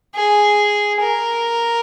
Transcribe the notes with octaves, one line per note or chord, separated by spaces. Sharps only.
G#4
A#4